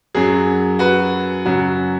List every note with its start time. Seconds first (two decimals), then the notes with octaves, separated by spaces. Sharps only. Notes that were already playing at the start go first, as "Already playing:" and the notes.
0.15 F#2 F#3 G#4
0.79 F#4 B4
1.45 F#2 C#3 F#3 F#4